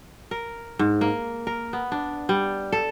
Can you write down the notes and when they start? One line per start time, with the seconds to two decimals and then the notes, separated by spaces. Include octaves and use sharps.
0.31 A#4
0.79 G#2
1.01 A#3
1.47 A#4
1.73 B3
1.92 D4
2.29 G3
2.72 A4